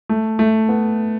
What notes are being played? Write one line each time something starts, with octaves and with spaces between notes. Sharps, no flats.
A3
A3
B3